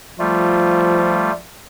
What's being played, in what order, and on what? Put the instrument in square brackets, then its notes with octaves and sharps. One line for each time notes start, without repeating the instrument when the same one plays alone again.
[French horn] F3 [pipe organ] G3 A3 F4